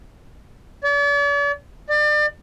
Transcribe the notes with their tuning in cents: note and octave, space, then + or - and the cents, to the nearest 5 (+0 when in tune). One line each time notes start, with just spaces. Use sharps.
D5 -45
D5 +30